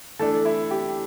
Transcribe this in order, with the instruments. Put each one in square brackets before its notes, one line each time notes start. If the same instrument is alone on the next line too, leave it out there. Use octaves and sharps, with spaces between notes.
[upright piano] E3 A3 D4 [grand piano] A4
[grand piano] E4
G4